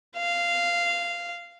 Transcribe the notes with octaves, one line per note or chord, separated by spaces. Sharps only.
F5